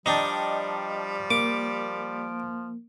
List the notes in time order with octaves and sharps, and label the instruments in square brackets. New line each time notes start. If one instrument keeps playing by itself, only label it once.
[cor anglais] F3 [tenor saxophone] G3 [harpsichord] D4 D#4 [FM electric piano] D#5 G5 A5
[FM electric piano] A#3 [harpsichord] D6